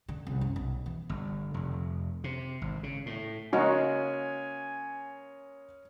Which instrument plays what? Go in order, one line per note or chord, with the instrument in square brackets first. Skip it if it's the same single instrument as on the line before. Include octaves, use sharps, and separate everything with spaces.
[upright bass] D3
C2
F#2
B1
E3
[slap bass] G1
F1
C3
G#1
C#3
A2
[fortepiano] C#3 G#3 A#3 [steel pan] D#4 F#4 [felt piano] C#5 [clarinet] G#5